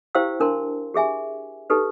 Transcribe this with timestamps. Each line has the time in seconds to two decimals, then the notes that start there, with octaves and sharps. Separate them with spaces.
0.15 E4 G4 C5 F5 G5 E6
0.40 D4 A#4 A5 C6
0.94 G4 G#4 E5 G#5
1.70 D#4 G4 A4 B4